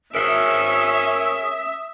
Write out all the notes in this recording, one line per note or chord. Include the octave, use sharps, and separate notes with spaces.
C#4 G#4 A#4 E5 D#6